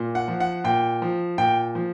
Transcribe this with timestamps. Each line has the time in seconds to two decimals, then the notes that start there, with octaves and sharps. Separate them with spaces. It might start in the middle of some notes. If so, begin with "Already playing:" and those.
Already playing: A#2
0.15 F#5
0.28 F3
0.40 F#5
0.64 A#2 G5
1.02 F3
1.38 A#2 G5
1.75 F3